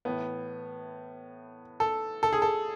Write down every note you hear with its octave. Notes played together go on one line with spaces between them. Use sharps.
A2 E3 B3
A4
A4
G#4
A4